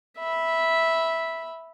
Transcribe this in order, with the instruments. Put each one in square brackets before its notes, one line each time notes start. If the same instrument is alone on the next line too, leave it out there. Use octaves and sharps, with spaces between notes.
[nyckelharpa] E5 B5